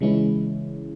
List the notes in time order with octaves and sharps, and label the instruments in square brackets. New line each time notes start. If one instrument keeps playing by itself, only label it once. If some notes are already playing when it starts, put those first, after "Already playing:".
[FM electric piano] C#3 E3 G#3 C#4 E4